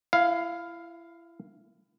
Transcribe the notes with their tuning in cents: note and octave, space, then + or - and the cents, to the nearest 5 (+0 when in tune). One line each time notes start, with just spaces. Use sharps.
E4 +30 F5 +0